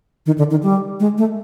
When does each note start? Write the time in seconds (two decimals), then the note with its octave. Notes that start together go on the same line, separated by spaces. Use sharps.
0.26 D#3
0.38 D3
0.51 D#3
0.63 G3
1.00 G#3
1.18 A3